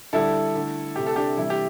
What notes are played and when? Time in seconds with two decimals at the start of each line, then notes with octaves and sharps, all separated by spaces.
0.13 D3 G3 E4 A4
0.55 D3 A3
0.96 C3 A3 G4
1.07 A4
1.16 D4 G4
1.37 C3 E3 G3 E4
1.50 G4